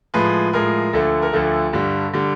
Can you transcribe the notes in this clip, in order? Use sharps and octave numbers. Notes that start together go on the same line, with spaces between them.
A2 F3 G#3 B4
A2 F3 G#3 A#4
D2 D3 F3 A3 A4
A#4
D2 D3 F3 A3 A4
G2 D3 G3
D3 G3